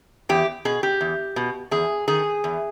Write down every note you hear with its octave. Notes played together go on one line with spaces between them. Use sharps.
E2 G4
B2 G#4
G4
E2
B2
E2 G#4
D#3 G#4
E2